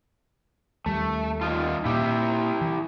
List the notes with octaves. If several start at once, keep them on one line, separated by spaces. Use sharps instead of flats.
D#2 G3 A3
D#3 D#4 F4
A#2 E4 G4
E3